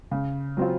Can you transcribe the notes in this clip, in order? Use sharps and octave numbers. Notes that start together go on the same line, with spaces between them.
C#3
F#3 C4 F4